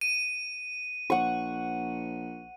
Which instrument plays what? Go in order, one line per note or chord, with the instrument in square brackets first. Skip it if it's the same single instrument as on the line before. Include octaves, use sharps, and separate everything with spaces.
[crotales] D#7
[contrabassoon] A#1 [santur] F#5 C#6